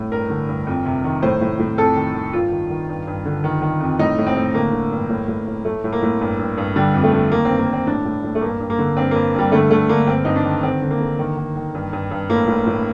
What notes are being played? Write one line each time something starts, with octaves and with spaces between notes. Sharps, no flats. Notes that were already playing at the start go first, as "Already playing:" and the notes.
Already playing: A2
G2 A#4
D3
G2
F2
C3
D#3
A2 C5
A2
A2
F2 A4
D#3
D#3
G2 F4
D#3
D#3
G2
G2
D3
D#3
D#3
F2
A2 D#4
A2
C4
A2
D3 A#3
D3
G2
A2
A2
A2
A2 A3
A2
A#3
A2
G2
G2
G2
D3 G3
F2
A3
D3
D#3 A#3
G2 C4
A#3
G2 C4
A2 D4
A2
A2
A3
G2 A#3
G2
A#3
D3
G2 C4
G2 A#3
G2 G3
D3 A3
D3 A3
D3 A#3
G2 C4
G2 D#4
D4
D#3
D3 C4
D3
A#3
D3
D#3
D#3
D#3
G2
G2
G2
A2 A#3
A2
A2